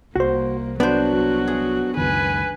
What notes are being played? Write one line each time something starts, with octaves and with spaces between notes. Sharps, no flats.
C2 A#3 F#4 C5
F#3 B3 D4 F#4 C5
G#4
C#2 F#2 D#3 B4 G#5